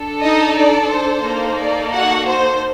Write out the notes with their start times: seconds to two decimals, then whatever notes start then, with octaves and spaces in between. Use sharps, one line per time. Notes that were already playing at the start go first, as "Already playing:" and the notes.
Already playing: D4 A4
0.23 D#4 D#5
0.57 D5
0.91 C5
1.25 A#3 D#4 A4
1.59 D5
1.93 F#4 F#5
2.27 C5